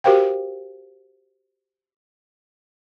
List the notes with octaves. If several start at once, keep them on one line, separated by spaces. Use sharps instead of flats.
F#4 G4 A#4 C5 F5 G5